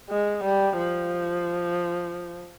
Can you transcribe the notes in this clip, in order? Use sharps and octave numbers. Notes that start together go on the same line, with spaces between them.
G#3
G3
F3